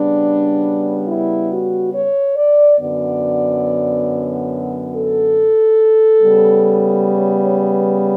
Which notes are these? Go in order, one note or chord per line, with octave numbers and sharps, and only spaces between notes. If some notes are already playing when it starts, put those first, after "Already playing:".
Already playing: C#3 G3 B3 D4
E4
F#4
C#5
D5
F#2 D3 F#3 B3 D5
A4
C#3 G3 B3
C#5
C#5
B4